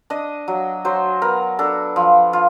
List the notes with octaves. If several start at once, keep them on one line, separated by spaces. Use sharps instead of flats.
D4 D#5
F#3
F#3 C5
B3 A#4
D4 A4
F3
F4